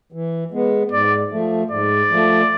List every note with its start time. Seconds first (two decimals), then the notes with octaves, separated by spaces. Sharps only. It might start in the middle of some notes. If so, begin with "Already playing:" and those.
0.12 E3
0.51 G#3 B3
0.91 G#2 D5
1.31 F3 A3
1.70 G#2 D5
2.10 F3 A3